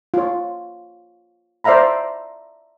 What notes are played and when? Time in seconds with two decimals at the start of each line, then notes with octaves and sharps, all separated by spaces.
0.14 F4 C#5
1.64 C5 D5 E5 F5 A#5 B5